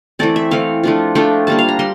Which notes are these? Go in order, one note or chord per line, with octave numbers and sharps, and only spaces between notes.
E3 A3 C4 D5
E5
E3 A3 C4 F5
F3 A3 D4 F4
F3 A3 D4 F4 G5
G3 A#3 D4 A5
F5
A#5
G3 C6